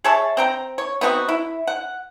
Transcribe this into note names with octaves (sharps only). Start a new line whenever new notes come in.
G#4 C#5 E5 A5
C4 G5 A#5
C#5
B3 C4 D#4 F#4
E4
F#5